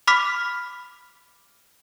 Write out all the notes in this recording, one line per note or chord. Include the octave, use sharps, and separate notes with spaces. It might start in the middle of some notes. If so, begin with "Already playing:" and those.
B5 D6 F6 B6